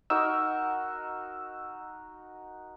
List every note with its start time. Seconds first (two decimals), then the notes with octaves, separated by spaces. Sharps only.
0.10 D#4 F#4 A#4 D#5 E6